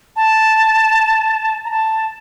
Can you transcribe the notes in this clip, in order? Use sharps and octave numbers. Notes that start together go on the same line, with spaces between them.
A5
A#5
A5